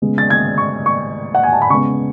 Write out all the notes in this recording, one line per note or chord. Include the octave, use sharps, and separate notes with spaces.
C#3 G#3 B3
A6
G#6
C#6
C#6
F#5
G#5
A5
B5
C#3 G#3 B3 C#6